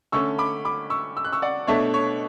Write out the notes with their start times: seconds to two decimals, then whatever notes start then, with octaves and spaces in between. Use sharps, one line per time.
0.12 D3 A3 C#4 C#6 E6
0.39 B5 D6
0.65 B5 D6
0.90 C#6 E6
1.17 E6
1.25 F#6
1.33 C#6 E6
1.42 D5 F#5
1.67 B2 A3 D4 C#5 E5
1.94 C#5